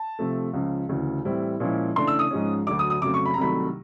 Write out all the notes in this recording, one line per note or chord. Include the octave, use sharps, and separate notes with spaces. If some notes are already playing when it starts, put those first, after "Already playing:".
Already playing: A5
C3 F3 A3
C#2 C#3 F3
D2 C#3 E3
A2 E3 G3 C4 E4
A#2 F3 G#3 C#4 E4
C#3 E3 A3 D4 C6
E6
D#6
G#2 F3 G#3 C#4
D2 D3 F#3 D6
D#6
D#6
F2 C#3 F#3 A3 D6
C#6
B5
A#5
C2 C3 D#3 F#3 A3 B5